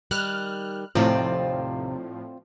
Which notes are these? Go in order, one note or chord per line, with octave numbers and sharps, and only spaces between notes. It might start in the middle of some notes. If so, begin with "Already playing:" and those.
D#3 G3 F6 F#6
D#2 A2 C3 F3 C4 F4 D5 G5